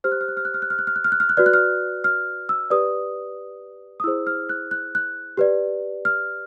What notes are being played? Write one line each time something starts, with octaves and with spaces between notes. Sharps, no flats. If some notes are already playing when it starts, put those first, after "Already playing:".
G4 C5 F6
F#6
F6
F#6
F6
F#6
F6
F#6
F6
F#6
F6
F#6
F6
F#6
F6
F#6
F#4 B4 D5 F6
F#6
F6
F6
E6
G4 B4 D5 D#6
D#6
E4 G#4 C5 E6
F6
F#6
F#6
F#6
G4 B4 D5
F6